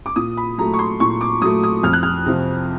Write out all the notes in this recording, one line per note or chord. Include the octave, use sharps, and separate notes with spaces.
D6
A#2 D#6
B5
F#3 A3 A#5
C#6
C6
A#2 C#6
D6
F#3 A3 D#6
D#6
F2 F6
F#6
F6
C3 F3